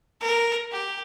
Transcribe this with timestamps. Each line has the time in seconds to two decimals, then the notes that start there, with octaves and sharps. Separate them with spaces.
0.21 A#4
0.72 G4